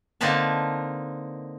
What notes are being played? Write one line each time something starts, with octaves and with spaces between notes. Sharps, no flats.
D3 A#3 C4 D#4 B4 A5